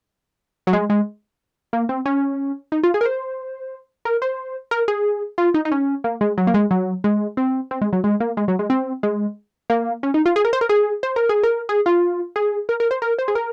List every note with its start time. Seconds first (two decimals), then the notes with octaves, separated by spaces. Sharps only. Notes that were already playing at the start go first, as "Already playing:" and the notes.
0.67 F#3
0.73 G#3
0.90 G#3
1.73 A#3
1.89 C4
2.06 C#4
2.72 D#4
2.83 F4
2.94 G#4
3.01 A#4
3.05 C5
4.05 A#4
4.22 C5
4.71 A#4
4.88 G#4
5.38 F4
5.54 D#4
5.65 D#4
5.72 C#4
6.04 A#3
6.21 G#3
6.38 F#3
6.47 A#3
6.54 G#3
6.71 F#3
7.04 G#3
7.37 C4
7.71 C4
7.81 G#3
7.93 F#3
8.04 G#3
8.20 A#3
8.37 G#3
8.48 F#3
8.59 G#3
8.70 C4
9.03 G#3
9.70 A#3
10.03 C#4
10.14 D#4
10.26 F4
10.36 G#4
10.45 A#4
10.53 C5
10.61 A#4
10.69 G#4
11.03 C5
11.16 A#4
11.29 G#4
11.43 A#4
11.69 G#4
11.86 F4
12.36 G#4
12.69 A#4
12.80 A#4
12.91 C5
13.02 A#4
13.18 C5
13.28 G#4
13.35 A#4